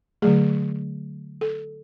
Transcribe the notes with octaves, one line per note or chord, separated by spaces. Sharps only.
D3 F#3 A3 G#4
A4